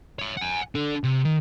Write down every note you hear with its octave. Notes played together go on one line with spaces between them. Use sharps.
C#5 E5
F#5 G#5
D4 A4
C3
D#3